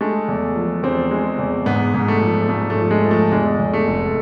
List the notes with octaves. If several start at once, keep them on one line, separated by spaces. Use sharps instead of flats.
G#3 A3
E2
F3
E2 C4
G#3
E2
G#2 B3
G#2
A3
F3
G#2 A3
A3
F3
G#3
F3
A3
E2 G#3
E2
A3
F1